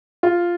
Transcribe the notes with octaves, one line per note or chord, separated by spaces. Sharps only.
F4